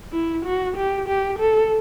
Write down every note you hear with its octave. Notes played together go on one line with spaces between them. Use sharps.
E4
F#4
G4
G4
A4